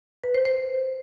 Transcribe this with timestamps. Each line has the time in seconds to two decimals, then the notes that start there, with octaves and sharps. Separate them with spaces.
0.24 B4
0.34 C5
0.45 C5